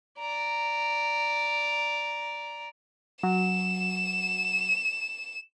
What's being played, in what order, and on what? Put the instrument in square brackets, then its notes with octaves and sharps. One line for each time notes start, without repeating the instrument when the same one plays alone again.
[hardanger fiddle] D5 A#5
[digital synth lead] F#3 [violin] E7